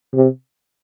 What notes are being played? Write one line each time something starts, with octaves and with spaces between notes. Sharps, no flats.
C3